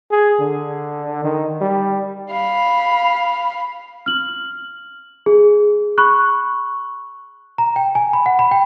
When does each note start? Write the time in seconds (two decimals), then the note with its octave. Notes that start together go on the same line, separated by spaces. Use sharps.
0.11 G#4
0.40 D3
1.24 D#3
1.61 G3
2.32 F5 B5
4.06 F6 F#7
5.26 G#4
5.98 B5 C#6 F#6
7.58 A#5
7.76 G5
7.95 G#5
8.13 B5
8.26 F#5
8.39 B5
8.51 G5